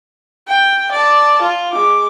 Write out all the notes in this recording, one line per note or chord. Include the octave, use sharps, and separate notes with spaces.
G5
D5 A5
F4
G#3 D6